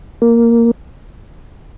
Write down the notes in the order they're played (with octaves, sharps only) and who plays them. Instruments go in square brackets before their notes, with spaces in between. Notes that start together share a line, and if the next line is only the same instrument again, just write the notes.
[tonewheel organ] A#3